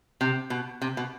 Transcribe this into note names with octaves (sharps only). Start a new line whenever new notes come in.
C3
B2
C3
B2